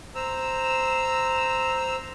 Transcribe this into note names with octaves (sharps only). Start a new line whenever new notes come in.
C5 A#5 E6